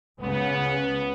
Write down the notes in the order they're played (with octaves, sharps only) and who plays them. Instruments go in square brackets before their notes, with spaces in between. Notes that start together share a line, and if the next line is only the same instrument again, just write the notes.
[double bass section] C#2 C#3 [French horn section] B3